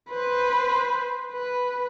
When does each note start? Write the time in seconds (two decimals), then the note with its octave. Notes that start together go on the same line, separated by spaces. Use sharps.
0.10 B4 C5
1.32 B4